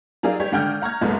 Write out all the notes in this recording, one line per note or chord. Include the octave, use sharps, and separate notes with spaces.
F#3 D#4 G#4 A#4 D5 F5
G3 G4 C#5
G#1 D3 F#5 G5 F6 G6
F#5 A#5 C#6 F6 G#6
C2 F#2 A#2 G#3 A3 B3